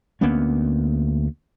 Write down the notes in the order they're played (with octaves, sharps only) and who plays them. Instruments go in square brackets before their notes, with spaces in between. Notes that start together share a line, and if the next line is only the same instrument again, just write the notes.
[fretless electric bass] D2 A#3 B3 C#4